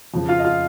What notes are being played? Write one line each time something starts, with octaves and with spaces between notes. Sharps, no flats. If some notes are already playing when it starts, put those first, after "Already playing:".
F2 C#3 F3
F4 F5
D#5
F4 F5